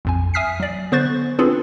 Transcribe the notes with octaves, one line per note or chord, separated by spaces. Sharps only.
A#1 F2 G#5
E5 G#5 D#6 F6 B6 C7
F#3 D5
D3 B3 C5 C#6 F#6 A6
C4 D4 F4 G#4 A4 B4